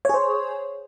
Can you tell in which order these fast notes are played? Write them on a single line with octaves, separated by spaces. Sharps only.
C#5 G#4 C5